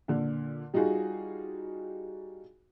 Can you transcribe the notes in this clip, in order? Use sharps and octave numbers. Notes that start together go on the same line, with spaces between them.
A#2 D3
G3 D#4 F4 F#4 G#4